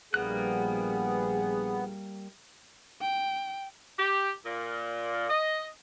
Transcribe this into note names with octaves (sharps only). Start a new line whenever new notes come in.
A#1 G3 A#3 B3 G#4 F#6
G5
G4
A#2
D#5